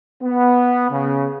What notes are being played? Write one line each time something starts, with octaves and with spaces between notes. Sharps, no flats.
B3
C#3